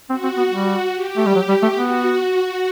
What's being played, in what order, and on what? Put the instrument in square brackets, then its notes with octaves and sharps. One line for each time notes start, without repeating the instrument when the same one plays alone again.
[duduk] C4 [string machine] F#4
[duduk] C4
B3
G3
[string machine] G4
[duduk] A3
G3
F#3
G3
A3
[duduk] B3 [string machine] F#4